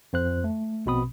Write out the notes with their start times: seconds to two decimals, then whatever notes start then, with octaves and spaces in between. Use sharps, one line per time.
0.13 F2 C5 F#6
0.44 A3
0.86 A#1 B2 C4 B5 D#6